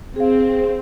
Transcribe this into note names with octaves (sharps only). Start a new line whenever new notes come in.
C4 G#4 F5